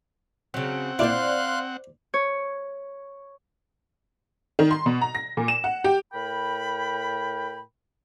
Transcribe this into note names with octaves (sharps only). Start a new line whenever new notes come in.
C#3 F#3 C4 F#5
A#2 D4 E4 C5 D5 F5 C6 F#6
C#5
D#3
C6
B2
A#5
A#6
A#2
E7
F#5
G4
A2 A#4 G5 B5